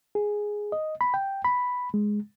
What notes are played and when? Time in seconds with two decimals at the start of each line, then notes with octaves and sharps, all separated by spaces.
0.15 G#4
0.72 D#5
1.01 B5
1.14 G5
1.45 B5
1.94 G#3